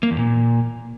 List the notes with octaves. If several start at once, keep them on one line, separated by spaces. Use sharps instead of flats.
A#3
E2
A#2